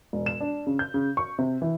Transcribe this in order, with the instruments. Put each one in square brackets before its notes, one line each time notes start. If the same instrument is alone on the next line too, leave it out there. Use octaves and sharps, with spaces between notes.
[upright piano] E1
E7
D4
C#3
G6
C#3
C#6
C3
E3